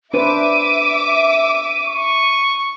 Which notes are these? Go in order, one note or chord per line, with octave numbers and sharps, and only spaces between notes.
D4 B4 C5 E5 D6 D#7
C#6